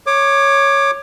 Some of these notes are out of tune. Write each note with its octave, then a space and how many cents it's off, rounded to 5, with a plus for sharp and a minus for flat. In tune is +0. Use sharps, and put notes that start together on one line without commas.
C#5 +0 D6 +20